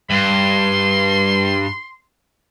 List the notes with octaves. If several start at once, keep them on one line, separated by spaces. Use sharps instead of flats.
G2 C6